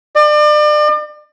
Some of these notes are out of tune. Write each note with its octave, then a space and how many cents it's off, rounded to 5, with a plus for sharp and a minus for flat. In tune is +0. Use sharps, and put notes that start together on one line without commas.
D5 +35